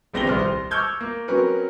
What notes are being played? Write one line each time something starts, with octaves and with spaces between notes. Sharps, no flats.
D#1 A#1 C4 A#6 F7 G7
D#1 C2 C5 F6
C5
C#6 D6 E6 F6 G6 G#6
A#3
F#3 C4 C#4 A#4 B4